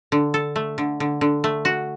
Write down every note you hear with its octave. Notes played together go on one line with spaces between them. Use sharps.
D3
A4
A3
D3
D3
D3
A3
F#4